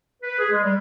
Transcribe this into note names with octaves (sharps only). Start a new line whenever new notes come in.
B4
G#4
G#3
G3